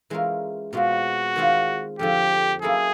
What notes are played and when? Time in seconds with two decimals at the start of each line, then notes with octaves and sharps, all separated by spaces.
0.10 E3 G#3 C#4 F4 A#4
0.73 B2 G#3 C4 F4 F#4
1.36 D#3 G#3 C4 F4
1.99 F2 D3 F3 G4
2.62 F#3 A#3 C#4 E4 G#4 A4